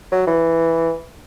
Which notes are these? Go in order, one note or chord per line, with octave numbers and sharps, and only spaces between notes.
F#3
E3